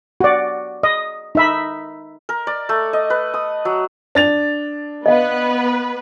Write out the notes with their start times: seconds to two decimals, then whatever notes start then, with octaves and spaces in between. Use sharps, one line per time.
0.21 F#4 D5
0.83 D#5
1.35 D#4 E5 B5
2.29 A#4
2.47 D5
2.69 A3
2.93 D#5
3.10 B4
3.34 D#6
3.65 F#3
4.15 D4 A6 F7
5.06 B3 B4 D#5 F5